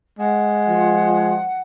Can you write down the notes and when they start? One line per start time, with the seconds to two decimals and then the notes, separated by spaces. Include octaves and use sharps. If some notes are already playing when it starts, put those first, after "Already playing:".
0.19 G#3 F#5
0.69 F3 F4